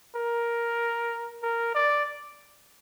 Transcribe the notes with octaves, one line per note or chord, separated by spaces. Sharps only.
A#4
A#4
D5